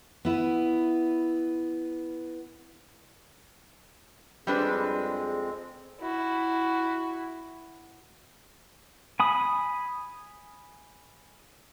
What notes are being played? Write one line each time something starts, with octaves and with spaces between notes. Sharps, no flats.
B3 E4 B4
F2 G3 G#3 C4 D4 G#4 B4
E4 F#4
G#5 B5 D#6